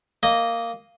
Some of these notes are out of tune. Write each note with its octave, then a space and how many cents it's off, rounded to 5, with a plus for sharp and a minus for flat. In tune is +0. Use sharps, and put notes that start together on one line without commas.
A#3 -10 D#5 +0